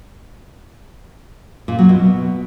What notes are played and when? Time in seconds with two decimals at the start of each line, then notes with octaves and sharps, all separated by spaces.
1.68 A#2
1.79 F#3
1.89 B2